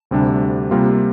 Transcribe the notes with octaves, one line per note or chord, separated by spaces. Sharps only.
D2 C3 G3 D4
C3 G3 A#3 F4